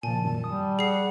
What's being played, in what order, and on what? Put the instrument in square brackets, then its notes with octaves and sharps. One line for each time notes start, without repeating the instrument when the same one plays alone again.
[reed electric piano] A#2 C#3 F3 [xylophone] G#5 [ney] A5
[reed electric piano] F#2 A#2 D#3 [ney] A5
[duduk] G3 [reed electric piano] D#6
[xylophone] G#4 C7 [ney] F#5